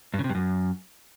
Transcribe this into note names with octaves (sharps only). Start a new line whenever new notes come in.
G2
C#3
C3
G2
F#2